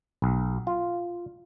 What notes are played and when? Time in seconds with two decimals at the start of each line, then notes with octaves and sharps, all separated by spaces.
0.22 B1
0.67 F4